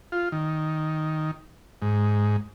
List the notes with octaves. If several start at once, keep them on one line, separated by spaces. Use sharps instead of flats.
F4
D#3
G#2